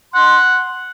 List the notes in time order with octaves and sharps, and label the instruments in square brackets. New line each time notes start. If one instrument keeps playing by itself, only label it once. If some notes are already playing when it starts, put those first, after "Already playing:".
[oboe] F#5 [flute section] C6